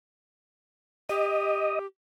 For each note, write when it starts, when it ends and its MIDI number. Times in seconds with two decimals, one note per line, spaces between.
1.09 1.86 67
1.09 1.79 75